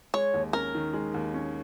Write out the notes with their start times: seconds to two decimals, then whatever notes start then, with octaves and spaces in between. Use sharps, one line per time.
0.14 G#3 C#5
0.34 D#2
0.53 C#4 A#4
0.75 D#3
0.93 G#3
1.14 D#2
1.34 C#4